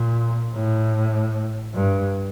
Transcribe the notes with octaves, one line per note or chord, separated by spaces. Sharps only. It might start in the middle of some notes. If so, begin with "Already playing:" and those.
Already playing: A#2
A2
G2